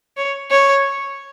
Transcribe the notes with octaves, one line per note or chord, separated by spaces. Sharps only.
C#5
C#5